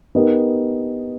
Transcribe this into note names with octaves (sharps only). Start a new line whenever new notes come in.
B3 D#4 G4 A#4